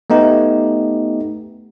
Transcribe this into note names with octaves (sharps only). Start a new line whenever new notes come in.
A3 B3 D#4 G4